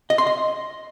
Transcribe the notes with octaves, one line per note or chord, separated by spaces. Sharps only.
D#5
C6
D#5